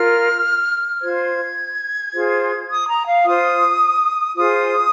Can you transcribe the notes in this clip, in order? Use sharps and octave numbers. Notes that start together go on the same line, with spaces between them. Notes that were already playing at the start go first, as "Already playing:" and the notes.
Already playing: F4 A#4 F6
F4 C5 G#6
F4 G#4 C5
D#6
A#5
F5
F4 C5 D#6
F4 G#4 C5 D#6